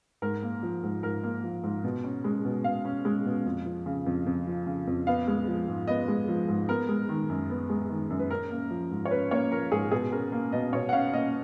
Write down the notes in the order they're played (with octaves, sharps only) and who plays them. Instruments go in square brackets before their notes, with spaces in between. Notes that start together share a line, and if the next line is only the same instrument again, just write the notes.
[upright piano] G#2 A#4
A#3
F3
G#2
G#2 A#4
A#3
F3
G#2
B2
C#4
G#3
B2
B2 F5
C#4
G#3
B2
F2
F3
C#3
F2
F2
F3
C#3
F2
B3 F5
G#3
F3
G#2
B3 D#5
G#3
F3
G#2
B3 A#4
G#3
D#3
F#2
B3
G#3
D#3
F#2
B4
C#4 A#4
A#3
F3
G#2
C#5
C#4 B4
A#3 C#5
F3 A#4
G#2 G#4
B2 G#4
C#4 A#4
A#3
B2 D#5
B2 C#5
F#5
C#4 F5
A#3 D#5